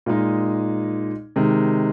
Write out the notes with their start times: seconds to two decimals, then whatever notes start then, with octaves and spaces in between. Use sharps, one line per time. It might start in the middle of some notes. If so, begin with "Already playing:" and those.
0.06 A#2 G#3 D#4
1.36 C3 D#3 G#3